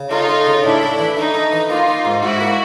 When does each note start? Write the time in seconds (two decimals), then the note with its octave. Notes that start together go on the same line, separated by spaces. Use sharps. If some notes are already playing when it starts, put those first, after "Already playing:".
Already playing: C#3
0.11 A3 D#4 F4
0.29 A3
0.46 C#3
0.64 A2 D4 E4
0.81 A3
0.99 E3
1.17 A3 D#4
1.34 A3
1.52 E3
1.70 A#3 D#4 F4
1.88 A#3
2.05 G#2
2.23 G#2 E4 F#4
2.41 A#3